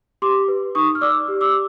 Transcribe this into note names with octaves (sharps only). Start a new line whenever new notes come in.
G4 C6 D6
B4
D#4 C#6 D#6
F6
D5 D6 E6
G4
D6 E6